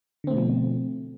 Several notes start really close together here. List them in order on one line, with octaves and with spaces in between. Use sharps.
D3 C4 A3 B2 F3